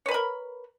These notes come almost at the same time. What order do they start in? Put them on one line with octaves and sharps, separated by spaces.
C#5 B4 B5 A#4